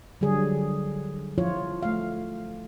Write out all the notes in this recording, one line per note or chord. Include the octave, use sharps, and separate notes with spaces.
D3 F#3 G3 G#4
F3 E4 F4 C#5
A3 F5